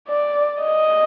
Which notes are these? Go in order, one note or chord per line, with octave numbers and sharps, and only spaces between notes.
D5
D#5